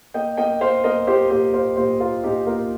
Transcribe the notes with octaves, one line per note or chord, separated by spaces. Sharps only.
A#3 D#5 G5
A#3 D#5 G5
A#3 C5 F5
A#3 A#4 D#5
A#3 G4 C5
A#2 G4 C5
A#3 C5 F5
A#2 G4 C5
A#3 F4 A#4
A#2 D#4 G4
A#3 F4 A#4